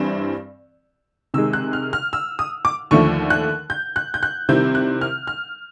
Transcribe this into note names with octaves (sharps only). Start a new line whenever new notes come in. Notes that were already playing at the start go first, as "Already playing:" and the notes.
Already playing: G2 E3 G3 C4
C3 D#3 G#3 E6
F#6
F6
F6
E6
D#6
D6
D#2 D3 F3 A3 C#6
F#6
G6
F#6
G6
F#6
C3 D#3 G3 C4 E4 G6
F#6
F6
F6